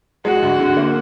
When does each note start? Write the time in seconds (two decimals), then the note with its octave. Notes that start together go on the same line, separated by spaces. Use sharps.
0.25 G#3 F#4
0.42 D2
0.60 D3
0.77 A#3